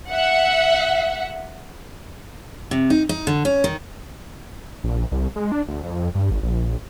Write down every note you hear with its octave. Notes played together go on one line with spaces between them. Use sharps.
E5 F#5
C3
D#4
D#4
D3
C#4
D#3
A#1
C2
G#3
D4
D2
F2
G2
G#1
A#1